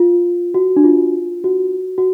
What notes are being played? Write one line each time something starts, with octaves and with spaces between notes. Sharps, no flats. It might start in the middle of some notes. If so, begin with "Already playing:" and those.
Already playing: F4
F#4
D4
F4
F#4
F#4